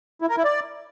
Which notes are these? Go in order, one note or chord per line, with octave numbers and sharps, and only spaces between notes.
E4
A#4
E4
D5